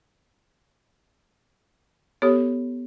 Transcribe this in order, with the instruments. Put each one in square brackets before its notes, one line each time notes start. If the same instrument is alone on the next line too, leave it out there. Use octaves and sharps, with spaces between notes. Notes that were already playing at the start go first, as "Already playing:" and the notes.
[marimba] B3 [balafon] G4 A4 C#5